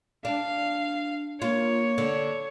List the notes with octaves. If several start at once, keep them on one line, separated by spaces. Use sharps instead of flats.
D4 F5
A#3 F4 C#5
D3